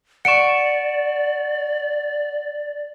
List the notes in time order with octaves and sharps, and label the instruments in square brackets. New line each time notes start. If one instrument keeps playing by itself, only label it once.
[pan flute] D5 [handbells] F#5 C#6 [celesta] C#7 D7 E7